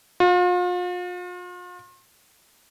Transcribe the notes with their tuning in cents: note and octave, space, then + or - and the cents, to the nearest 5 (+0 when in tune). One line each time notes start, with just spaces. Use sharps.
F4 +40